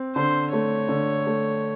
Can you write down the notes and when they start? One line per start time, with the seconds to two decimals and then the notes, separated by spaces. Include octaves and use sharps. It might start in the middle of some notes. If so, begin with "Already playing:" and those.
Already playing: C4
0.16 D3 C5
0.53 A3 C#5
0.89 D3
1.27 A3